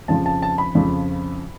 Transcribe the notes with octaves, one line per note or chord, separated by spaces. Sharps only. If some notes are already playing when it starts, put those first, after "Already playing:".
F2 C#3 F3 A5
A5
A5
B5
F2 C#3 F3